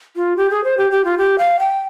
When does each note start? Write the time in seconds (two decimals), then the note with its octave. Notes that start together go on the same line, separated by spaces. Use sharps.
0.16 F4
0.37 G4
0.50 G#4
0.64 C5
0.78 G4
0.91 G4
1.05 F4
1.18 G4
1.38 F5
1.59 G5